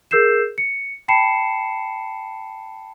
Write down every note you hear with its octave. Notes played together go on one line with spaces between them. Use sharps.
G#4 A#4 E6 G6 C7 E7
C#7
G5 A5 B5 C7 C#7 E7